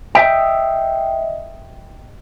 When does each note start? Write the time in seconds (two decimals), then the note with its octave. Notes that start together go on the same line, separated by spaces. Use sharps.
0.15 D#5 E5 G5